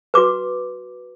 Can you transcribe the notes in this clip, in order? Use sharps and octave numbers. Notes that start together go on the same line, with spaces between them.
F#4 B4 D6